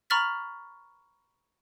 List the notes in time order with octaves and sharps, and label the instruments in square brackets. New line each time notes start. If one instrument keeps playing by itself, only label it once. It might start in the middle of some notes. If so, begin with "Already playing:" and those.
[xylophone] A#5 B5 C#6 F6 A6 B6